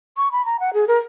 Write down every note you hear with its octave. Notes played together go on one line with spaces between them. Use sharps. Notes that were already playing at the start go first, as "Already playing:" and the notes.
C#6
B5
A#5
F#5
G#4
A#4